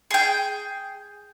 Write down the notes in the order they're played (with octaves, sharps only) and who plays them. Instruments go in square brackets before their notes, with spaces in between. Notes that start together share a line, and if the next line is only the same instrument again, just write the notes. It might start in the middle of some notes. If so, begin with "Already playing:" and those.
[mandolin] G#4 G5